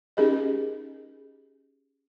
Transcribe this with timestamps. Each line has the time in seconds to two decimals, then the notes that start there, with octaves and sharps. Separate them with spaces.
0.17 C#4 D#4 G4 G#4 A#4 D#5